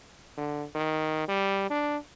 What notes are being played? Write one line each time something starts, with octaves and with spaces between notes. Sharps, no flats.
D3
D#3
G3
D4